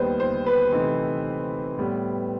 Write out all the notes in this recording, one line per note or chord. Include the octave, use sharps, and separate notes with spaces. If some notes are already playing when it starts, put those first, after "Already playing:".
Already playing: D#2 D#3 G3 B3 B4 C5
C5
B4
C3 E3 A3 D#4
A2 G3 B3